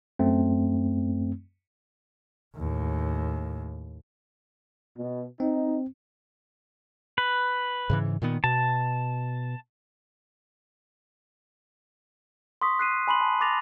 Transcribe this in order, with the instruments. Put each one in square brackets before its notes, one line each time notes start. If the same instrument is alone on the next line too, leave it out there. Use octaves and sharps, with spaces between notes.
[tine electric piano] F#2 A3 C4
[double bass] D#2 A2
[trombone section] B2
[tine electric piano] C4 [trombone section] D#4
[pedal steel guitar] B4
[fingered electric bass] G#2 C#3 E3
A#2 D#3 B3
[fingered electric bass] B2 [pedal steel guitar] A5
[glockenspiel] C6 C#6 D#6 B6
F#6 C7 D#7
G#5 B5 C6 F#7
A5
D6 A6 A#6 F7